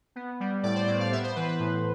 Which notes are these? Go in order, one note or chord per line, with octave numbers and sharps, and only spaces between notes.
B3
G3
A2 D5
C5
A2 D5
F5
B3 E5
C5
E3 B4
B4
A2